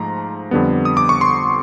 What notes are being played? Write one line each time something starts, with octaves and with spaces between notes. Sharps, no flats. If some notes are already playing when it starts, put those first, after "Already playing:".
Already playing: G#2 F3 A3 A#5
F2 D3 G3 B3
D#6
D6
C#6
C6